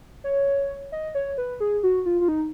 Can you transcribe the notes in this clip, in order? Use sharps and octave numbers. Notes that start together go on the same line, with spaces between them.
C#5
D#5
C#5
B4
G#4
F#4
F4
F4
D#4